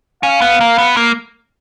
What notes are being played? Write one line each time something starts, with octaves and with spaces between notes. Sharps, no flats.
C#4 F5
B3
A#3
B3
A#3